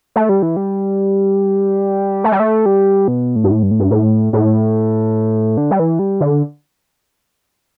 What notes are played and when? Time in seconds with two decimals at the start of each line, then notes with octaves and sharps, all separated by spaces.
0.16 A3
0.29 G3
0.43 E3
0.57 G3
2.24 A3
2.32 G3
2.40 A3
2.66 G3
3.08 B2
3.36 A2
3.44 G2
3.51 A2
3.63 G2
3.71 A2
3.79 G2
3.91 A2
4.33 A2
5.57 D3
5.71 G3
5.80 E3
5.99 G3
6.21 D3